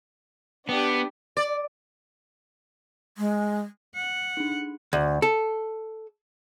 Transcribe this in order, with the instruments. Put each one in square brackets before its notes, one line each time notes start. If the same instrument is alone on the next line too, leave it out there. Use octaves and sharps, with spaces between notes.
[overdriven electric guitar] B3 [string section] D4 G4
[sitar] D5
[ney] G#3
[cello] F#5
[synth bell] D4 D#4
[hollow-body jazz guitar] D2
A4